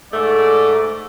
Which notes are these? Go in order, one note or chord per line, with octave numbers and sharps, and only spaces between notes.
G#2 A3 D5